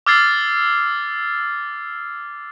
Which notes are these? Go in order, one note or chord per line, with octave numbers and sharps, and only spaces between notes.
D6 E6 F6 G#6 A6 C7